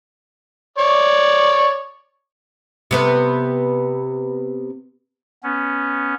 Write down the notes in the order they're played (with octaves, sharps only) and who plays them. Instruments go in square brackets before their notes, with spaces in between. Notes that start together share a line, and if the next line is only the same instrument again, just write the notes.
[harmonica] C#5 D5
[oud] C3 B3 B4
[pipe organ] B3 C#4